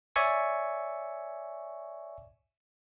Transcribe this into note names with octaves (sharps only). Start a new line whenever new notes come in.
C#5 D5 E5 G#5 C#6